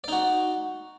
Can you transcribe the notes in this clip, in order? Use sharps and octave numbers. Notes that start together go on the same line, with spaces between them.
D#4 F#4 D5